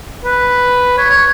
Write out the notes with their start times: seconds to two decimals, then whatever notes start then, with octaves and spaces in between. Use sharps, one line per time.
0.25 B4
0.98 C#5
1.11 C#5